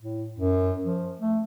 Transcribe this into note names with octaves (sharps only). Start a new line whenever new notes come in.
A2
F#2
F3
A3